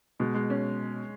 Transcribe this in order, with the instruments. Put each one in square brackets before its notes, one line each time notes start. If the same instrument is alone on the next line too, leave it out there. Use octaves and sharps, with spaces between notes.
[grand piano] B2 [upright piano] G#3
[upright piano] G#3
C#4